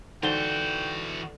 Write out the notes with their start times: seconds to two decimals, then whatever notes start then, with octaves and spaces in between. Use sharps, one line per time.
0.23 D3 E3 D#4 F#4 C5 G5 G7